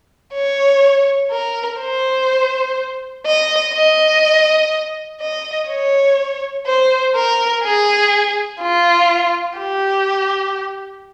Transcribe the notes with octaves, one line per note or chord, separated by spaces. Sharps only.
C#5
A#4
C5
D#5
D#5
D#5
C#5
C5
A#4
G#4
F4
G4